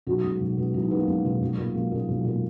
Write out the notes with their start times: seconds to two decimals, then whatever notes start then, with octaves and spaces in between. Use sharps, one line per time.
0.07 B1 F#4
0.24 B2 G#3
0.40 B1
0.57 B2 G#3
0.74 B1 E4
0.82 D#4
0.91 B2 G#3 B3
0.99 A#3
1.07 B1 G#3
1.24 B2 G#3
1.41 B1
1.58 A#2 G#3
1.75 B1 A#3
1.92 A#2 G#3
2.08 B1
2.25 A#2 G#3